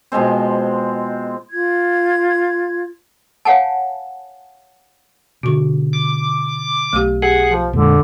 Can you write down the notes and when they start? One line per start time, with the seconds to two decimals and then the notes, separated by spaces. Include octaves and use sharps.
0.12 B2 F3 G#3 C4
1.50 F4 G#6
3.45 C#5 F5 F#5 G#5 A5
5.43 B2 D3 F#4 C#6
5.93 D6
6.93 B1 A3 G4
7.22 G4 G#4 F#5
7.49 F3
7.73 F2 A#2 D3 G#3